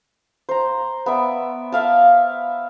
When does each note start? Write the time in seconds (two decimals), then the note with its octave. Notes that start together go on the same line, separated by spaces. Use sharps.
0.49 C5 A#5
1.06 B3 D5 E5
1.72 E5 F5 A5